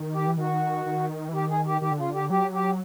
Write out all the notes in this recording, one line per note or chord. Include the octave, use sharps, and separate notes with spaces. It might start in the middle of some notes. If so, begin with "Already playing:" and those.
Already playing: D#3
G4
E3
D#3 F#4
D#3
E3
D#3 G4
G#4
G4
D#3 G4
D3
C#3 F4
D3 G4
F#3 G4
G4